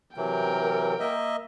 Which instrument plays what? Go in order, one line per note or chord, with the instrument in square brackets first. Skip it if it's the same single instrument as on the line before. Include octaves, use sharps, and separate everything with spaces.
[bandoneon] C3 E3 F#3 [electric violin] A#4 G5
[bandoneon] A#3 D#5 E5